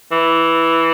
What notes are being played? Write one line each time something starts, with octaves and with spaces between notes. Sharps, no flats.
E3